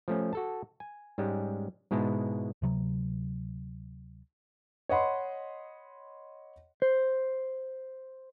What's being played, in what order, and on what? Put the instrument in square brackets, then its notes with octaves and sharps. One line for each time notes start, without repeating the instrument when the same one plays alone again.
[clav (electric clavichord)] F3 A3 C#4
F#4 A4 A5
G#5
G#2 G3 G#3 C#4
G#2 B2 G#3 E4 A5
[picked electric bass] D2 C3 F#3
[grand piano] C#5 D#5 F#5 B5 C6
[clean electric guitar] C5